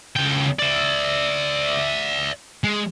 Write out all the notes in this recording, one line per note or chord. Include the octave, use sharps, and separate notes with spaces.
C#2 G5
D5 E5
G#3